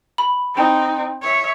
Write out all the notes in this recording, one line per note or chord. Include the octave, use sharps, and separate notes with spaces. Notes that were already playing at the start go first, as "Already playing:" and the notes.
B5
C4 D#4
C#5 E5